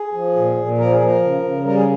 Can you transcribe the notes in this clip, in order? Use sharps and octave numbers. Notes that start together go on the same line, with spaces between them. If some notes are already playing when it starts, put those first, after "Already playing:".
Already playing: G#4
F3
A#2
A#2
F3 A#4
G#4
F3
A#4
C#3
C#3
G3 A#4
G#4